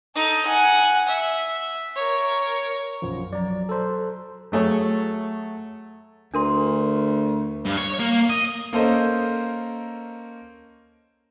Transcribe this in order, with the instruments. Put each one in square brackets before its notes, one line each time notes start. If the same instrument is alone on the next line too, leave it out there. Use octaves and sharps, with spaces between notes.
[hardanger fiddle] D#4 A4
F#5 G#5
E5
A#4 C#5
[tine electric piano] B1 F#2 F3
[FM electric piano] F#3 A#5 [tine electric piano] D5
[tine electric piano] A4 C5
[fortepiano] F#3 A3 G#4 C#5
[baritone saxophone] D2 [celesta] D4 A#4 C6
[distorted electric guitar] G2
C#5
A#3
D#5
[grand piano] A#3 C#4 A4 A#4 C5 D#5